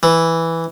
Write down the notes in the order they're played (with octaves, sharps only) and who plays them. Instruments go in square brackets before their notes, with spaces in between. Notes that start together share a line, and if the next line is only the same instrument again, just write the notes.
[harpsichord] E3